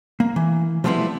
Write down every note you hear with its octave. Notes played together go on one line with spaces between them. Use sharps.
A#3
E3
F3 G3 A3 B3 C4 E4